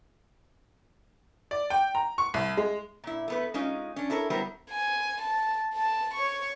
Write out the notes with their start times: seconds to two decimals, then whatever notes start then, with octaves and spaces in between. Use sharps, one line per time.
1.51 D5
1.70 G5
1.95 A#5
2.18 C#6
2.34 C2
2.57 G#3
3.04 A#2 E4
3.28 A3 B3 B4
3.54 G#3 C#4 D#4 F4
3.96 C#4 D4
4.10 E4 A4 A#4 C5 C#5
4.30 F#3 G3 B3 E4 A#4 C5
4.71 G#5
5.22 A5
5.74 A5
6.14 C#5 C#6